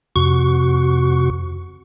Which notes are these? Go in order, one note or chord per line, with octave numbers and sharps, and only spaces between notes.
F2 C3 F#4 C#6